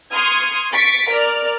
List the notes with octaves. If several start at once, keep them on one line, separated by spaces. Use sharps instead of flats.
C6 C#6 D#6 F6 G#6
C#6 A6 B6 D7
A#4 D5 F6